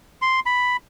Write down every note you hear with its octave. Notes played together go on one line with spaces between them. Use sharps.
C6
B5